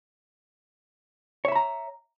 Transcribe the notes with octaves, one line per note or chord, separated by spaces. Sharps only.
C#5 E5 A#5 B5